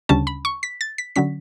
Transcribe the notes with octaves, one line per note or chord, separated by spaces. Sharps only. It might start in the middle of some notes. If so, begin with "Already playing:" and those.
D2 C#3 G3 C#4 A5
B5
C#6
B6
A6
B6
D3 F#3 C#4 B6